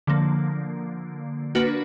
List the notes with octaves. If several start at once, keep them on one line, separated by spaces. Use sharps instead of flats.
D3 F3 A#3
A#3 D4 F#4 B4